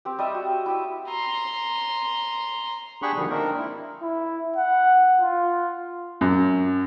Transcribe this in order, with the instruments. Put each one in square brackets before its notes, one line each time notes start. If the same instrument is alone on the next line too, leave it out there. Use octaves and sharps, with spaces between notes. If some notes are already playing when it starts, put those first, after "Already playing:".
[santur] C4 G4
G3 D#5 E5
F#4
E4 G4 D#6
[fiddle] A#5 C6
[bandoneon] D4 G4 G#4 F#5 B5 C#6
B2 D3 D#3 F3 G3
A#3 C4 D4 D#4 A#4
E4
[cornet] E4
F#5
F4
[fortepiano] F#2